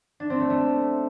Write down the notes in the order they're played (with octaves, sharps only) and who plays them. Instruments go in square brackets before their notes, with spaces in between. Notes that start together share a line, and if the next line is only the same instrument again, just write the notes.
[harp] D4
C4
A3
A3